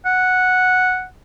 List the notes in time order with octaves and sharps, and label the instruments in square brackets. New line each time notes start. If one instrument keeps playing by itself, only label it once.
[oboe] F#5